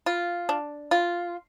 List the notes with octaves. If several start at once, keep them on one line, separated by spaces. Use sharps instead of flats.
F4
D4
F4